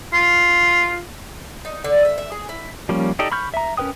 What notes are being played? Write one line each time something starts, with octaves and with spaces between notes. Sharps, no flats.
F4
D#4
D3
E5
E5
G#4
E4
F3 G3 A#3 C#4
D#4 G4 A4 D5 D#5
B5 C#6 F6 G6
E5 A#5
C#4 A#4 B4 G5 D#6